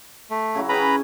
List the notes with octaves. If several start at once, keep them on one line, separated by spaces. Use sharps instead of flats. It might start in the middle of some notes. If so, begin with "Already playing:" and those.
A3
C#3 F#3 E4
C#4 G#4 B4 G5 A#5 B5